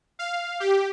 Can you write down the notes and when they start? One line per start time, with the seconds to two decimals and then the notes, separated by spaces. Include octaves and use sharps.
0.19 F5
0.60 G4